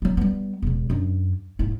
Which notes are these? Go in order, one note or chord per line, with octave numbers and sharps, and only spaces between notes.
F#3 A3
G3 B3
E1 C#3
F#2 D4
G#2 E4